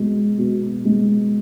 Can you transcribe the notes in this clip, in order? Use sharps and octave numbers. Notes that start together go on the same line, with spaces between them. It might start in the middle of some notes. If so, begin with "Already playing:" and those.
Already playing: B2 G#3
B2
G#3